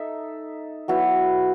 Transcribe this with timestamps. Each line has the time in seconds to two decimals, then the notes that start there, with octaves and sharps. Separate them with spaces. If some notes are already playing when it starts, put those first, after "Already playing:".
Already playing: D#4 A4 E5
0.88 F#3 B3 E4